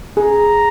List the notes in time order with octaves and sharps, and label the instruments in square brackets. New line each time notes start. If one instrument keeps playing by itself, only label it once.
[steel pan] G#4 [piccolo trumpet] A#5